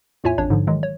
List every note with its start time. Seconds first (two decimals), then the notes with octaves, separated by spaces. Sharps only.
0.24 E2 A2 F4 C#5 E5 G#5
0.38 A1 F2 D4 C#5
0.50 G#2 D3 F3
0.67 D#3 E3 F#3 G#3
0.83 C#5